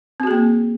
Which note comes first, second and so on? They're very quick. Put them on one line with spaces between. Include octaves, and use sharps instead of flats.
C4 F#4 G#4 A#3